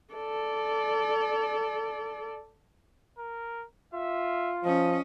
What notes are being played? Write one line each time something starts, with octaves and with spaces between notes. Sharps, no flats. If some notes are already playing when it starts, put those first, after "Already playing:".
A4 D5
A#4
F4 E5
F3 C#4 D#5